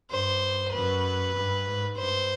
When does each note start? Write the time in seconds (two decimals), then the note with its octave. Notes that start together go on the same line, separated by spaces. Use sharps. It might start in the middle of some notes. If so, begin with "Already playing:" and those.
0.10 G2 C5
0.73 F#2 B4
1.35 G2
1.66 G#2
1.97 G2 C5